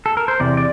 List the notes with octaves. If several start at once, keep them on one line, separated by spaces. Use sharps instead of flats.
A4
A#4
C5
E2 C3 D5
D5